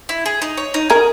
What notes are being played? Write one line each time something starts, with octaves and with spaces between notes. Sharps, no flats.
E4
G#4
D#4
C#5
D#4
G#4 A#4